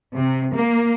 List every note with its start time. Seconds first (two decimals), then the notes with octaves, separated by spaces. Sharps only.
0.14 C3
0.54 A#3